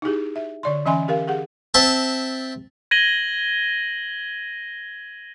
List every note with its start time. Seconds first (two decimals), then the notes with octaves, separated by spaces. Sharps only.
0.02 D#4 E4 G4 G#4
0.36 E5
0.63 D3 D5 C6
0.86 E3 C#4 D#5 E5 G#5 C6
1.08 G4 A#4 F5
1.28 G4 G#4 F#5
1.74 C4 E5 A5
2.91 G#6 A#6 D#7 F#7 G7